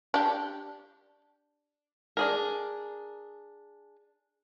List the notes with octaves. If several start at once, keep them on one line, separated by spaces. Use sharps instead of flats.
D4 G4
D4 G#4 A#4